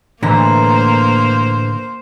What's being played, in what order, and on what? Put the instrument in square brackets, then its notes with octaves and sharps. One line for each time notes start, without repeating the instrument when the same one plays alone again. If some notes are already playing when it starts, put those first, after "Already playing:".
[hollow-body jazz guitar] A2 D3 [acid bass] E3 [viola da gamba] A#3 C5 [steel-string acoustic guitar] A#5